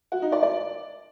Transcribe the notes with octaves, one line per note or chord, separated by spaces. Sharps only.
F#4
D#4
D5
D5